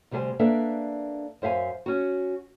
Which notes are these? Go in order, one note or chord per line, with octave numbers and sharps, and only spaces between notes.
D2 C3 G3 G#4 C5 G#5
A#3 D4 A4 B4 D5 E5
F#2 C5 E5 F5 G#5
C#4 F#4